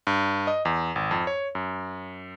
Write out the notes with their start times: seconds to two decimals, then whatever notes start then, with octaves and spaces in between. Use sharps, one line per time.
0.07 G2
0.47 D#5
0.65 E2
0.96 G#1
1.11 F2
1.27 C#5
1.55 F#2